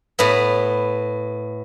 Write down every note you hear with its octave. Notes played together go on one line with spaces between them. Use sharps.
A2 B3